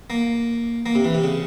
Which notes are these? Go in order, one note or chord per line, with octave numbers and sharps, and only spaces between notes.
A#3
A#3
C3
E3
C3
C#3